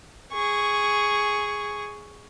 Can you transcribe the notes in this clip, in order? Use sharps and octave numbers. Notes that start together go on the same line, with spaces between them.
G#4 C#6